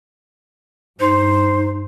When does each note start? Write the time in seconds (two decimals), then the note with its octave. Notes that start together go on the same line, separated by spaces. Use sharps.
1.00 G2 D#4 C5